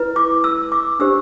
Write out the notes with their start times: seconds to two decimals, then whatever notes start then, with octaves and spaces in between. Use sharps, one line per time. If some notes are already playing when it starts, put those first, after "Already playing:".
Already playing: E4 B4
0.16 D6
0.44 E6
0.72 D6
0.99 D4 G4 C5 E6